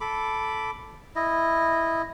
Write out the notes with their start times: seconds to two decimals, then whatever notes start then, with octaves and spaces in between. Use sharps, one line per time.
0.01 A4 B5 D6
1.16 E4 D#5